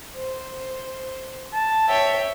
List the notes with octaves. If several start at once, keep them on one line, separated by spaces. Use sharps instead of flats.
C5
A5
C#5 E5 G5